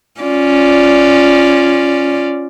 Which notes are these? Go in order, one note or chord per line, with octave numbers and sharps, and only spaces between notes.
C#4 F4 D5